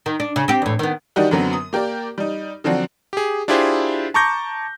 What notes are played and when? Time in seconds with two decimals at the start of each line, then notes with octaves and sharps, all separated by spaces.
0.06 D#3
0.20 D4
0.36 C#3
0.48 C4 G4
0.62 E2 A2
0.79 D#3 B3
1.16 D#3 G3 D4 D#4 F#4 G4
1.31 F#2 D3 F#3 B3 C4
1.53 D#6
1.73 A#3 G4 A#4 D5
2.18 G3 D#4
2.64 D3 F3 F#3 C4 D4 F#4
3.13 G4 G#4
3.48 D4 E4 F4 G4 G#4 C5
4.14 A5 A#5 C#6 D6 G6 A#6